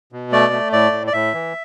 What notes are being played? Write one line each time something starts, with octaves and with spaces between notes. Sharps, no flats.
B2
A3 D5
A3
A2 D5
A2
D5
A2 E5
E3